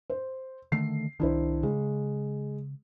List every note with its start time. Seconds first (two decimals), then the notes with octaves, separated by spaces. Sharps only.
0.10 C5
0.72 D3 D#3 A3 C7
1.20 C2 D#3 D4 E4 C5
1.63 C#3 G#3